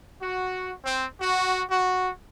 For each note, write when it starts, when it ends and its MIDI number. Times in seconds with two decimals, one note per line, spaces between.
0.21 0.72 66
0.85 1.06 60
1.19 1.64 66
1.70 2.09 66